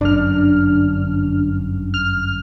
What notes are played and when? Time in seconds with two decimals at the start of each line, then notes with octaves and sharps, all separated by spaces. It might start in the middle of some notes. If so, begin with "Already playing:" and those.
0.01 G1 F#2 D3 D4 F6
1.94 F6